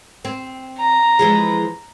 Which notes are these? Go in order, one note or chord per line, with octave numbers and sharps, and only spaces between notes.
C4
A#5
E3 F3 G#3